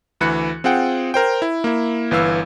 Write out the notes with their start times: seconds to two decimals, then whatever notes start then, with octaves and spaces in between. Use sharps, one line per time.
0.21 D2 E3 B5 F#6 C#7
0.64 C4 F4 G#4 F#5 G5
1.14 A#4 C5 G5
1.42 E4
1.64 A#3 E4
2.11 G1 E3 B4 F5 E6